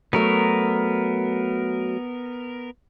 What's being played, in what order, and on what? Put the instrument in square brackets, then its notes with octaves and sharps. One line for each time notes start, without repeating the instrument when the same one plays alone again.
[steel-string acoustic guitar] F#3 A3 [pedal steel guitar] B3 A#4